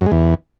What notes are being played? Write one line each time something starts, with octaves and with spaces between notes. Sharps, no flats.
F#2
G#3
E2